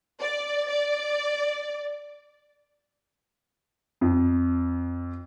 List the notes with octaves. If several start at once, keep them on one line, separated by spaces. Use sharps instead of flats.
D5
D5
F2